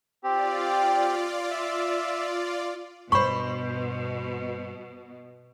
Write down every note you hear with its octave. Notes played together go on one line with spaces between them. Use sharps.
C4 F4 G4 D5
E5
G2 B2 C5 B5 C#6